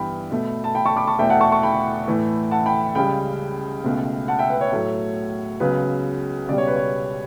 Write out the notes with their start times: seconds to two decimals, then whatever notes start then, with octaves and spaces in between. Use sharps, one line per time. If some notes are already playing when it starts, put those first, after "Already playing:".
Already playing: G2 E3 B3 G5 B5
0.31 B2 A3
0.64 A5
0.75 G5 B5
0.86 A5 C#6
0.96 B5 D6
1.07 A5 C#6
1.19 E2 B2 A3 E5 G5
1.30 F#5 A5
1.41 A5 C#6
1.52 A5 C#6
1.63 G5 B5
2.07 A2 E3 A3
2.51 F#5 A5
2.66 G5 B5
2.95 C#2 C#3 G3 G5 B5
3.84 C#2 B2 A3
4.28 F#5 A5
4.39 E5 G5
4.50 B4
4.61 C#5
4.72 A2 F#3 A3
5.60 C#2 C#3 F#3 B3 B4
6.48 C#2 B2 G3 D5
6.58 C#5
6.67 B4
6.76 C#5